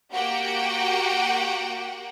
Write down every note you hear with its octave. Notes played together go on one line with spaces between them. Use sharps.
A#3 F#4 G4 F#5 G5